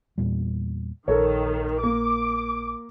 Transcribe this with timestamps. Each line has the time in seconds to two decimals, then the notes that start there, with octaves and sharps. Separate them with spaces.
0.18 E2 A#2 G3
1.08 A#1 D#3 A4 A#4 C#5
1.83 A#3 D6